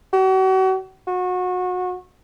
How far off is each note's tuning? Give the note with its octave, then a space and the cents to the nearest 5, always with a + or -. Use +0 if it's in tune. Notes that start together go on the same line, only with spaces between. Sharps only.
F#4 +40
F#4 -25